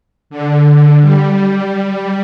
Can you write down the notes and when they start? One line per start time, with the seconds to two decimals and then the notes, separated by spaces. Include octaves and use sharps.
0.30 D3
1.01 G3